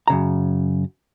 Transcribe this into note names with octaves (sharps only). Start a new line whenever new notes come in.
F#2 C#3 A#5